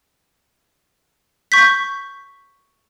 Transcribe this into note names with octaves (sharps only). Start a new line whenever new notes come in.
C#6 G6 B6